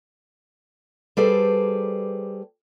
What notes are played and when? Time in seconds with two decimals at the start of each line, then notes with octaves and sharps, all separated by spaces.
1.17 G3 G#4 A4 B4 C5 D5